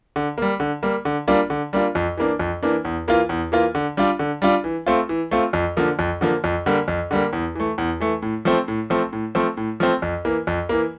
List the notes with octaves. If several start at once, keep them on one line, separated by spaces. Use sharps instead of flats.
D3
G3 A#3
D3
G3 A#3
D3
G3 A#3 D4 F4
D3
G3 A#3 D4 F4
F2
E3 A#3 D4
F2
E3 A#3 D4
E2
E3 A#3 F4
E2
E3 A#3 F4
D3
G3 D4 F4
D3
G3 D4 F4
E3
A3 C4 F4
E3
A3 C4 F4
F2
D3 F3 A#3
F2
D3 F3 A#3
F2
D3 G3 A#3
F2
D3 G3 A#3
E2
E3 A3
E2
E3 A3
A2
F3 A3 C4
A2
F3 A3 C4
A2
F3 A3 C4
A2
F3 A3 C4
F2
E3 A#3
F2
E3 A#3